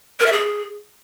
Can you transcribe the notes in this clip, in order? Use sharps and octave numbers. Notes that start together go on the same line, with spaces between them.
A#4
E5
G#4